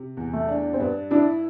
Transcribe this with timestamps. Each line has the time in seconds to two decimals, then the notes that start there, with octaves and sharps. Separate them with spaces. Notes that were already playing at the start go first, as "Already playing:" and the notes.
Already playing: C3
0.17 E2
0.33 A3
0.48 D4
0.73 C4
0.80 G2 B3
1.11 D4 E4